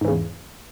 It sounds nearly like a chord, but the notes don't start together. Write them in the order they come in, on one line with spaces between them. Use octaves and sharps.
G#2 E3 C#3 E2